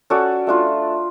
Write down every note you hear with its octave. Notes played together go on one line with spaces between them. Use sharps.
C#4 F#4 A4 D5
A3 D4 F4